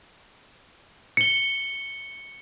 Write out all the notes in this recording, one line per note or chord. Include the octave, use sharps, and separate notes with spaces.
C#7 G7